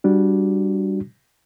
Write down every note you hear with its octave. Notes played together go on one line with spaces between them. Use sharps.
G3 D4 F#4